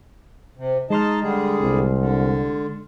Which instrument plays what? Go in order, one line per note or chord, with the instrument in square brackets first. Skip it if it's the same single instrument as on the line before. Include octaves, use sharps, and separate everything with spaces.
[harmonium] C3
[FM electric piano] G#3 C6 F6 [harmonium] D#4 D#5 A5
[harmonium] D3 G3 G#4
[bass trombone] C2
[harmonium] D3